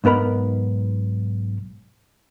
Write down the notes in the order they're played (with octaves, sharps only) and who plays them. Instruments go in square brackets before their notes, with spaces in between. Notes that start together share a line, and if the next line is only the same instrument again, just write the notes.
[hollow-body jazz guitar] B1 G#2 B3 A#4 B5